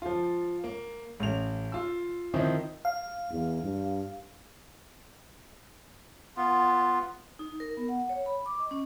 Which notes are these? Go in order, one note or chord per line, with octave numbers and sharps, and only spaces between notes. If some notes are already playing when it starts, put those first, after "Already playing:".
F3 F4
A#3
A1 F7
F4 E6
D#3 F3 C4 D#4 E4
F5
E2
G2
B3 F4
D#4
A#4
B3
F#5
C#5
B5
D6
D#5
C#4